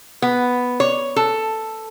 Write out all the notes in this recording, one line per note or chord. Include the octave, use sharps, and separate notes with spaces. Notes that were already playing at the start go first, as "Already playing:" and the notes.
B3
C#5
A4